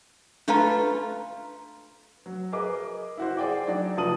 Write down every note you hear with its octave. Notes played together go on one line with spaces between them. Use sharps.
A3 D4 F4 B4 F5 A#5
F#3
G#4 A#4 B4 D#5 D6
E4 F#4 C5
G#4 D5 G5 D6
F#3 D4 D#4 D5
F1 F3 A5 D#6 D#7 F#7